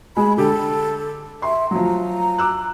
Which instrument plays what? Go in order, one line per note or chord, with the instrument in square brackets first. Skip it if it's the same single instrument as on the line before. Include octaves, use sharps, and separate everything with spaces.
[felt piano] G#3 [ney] B5
[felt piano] D3 G4 [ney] A4
[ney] E5 [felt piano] C6
[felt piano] F3 F#3 [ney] A#5
[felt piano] D6 E6 F#6